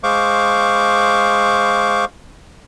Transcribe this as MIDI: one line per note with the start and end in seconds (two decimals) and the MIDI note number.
0.03 2.05 56
0.03 2.05 72
0.03 2.05 77
0.03 2.05 85
0.03 2.05 86